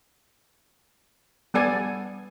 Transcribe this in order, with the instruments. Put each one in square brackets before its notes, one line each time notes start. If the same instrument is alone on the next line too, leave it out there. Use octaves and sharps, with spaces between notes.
[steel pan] G3 B3 A4 D5 G#5